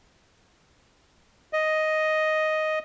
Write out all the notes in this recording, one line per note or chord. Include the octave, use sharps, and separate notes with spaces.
D#5